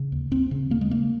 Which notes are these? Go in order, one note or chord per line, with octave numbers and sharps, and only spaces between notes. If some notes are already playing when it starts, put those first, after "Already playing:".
Already playing: C#3
D#2
D#2 C4
C#3
C#3 A#3
G#3
C#3 A#3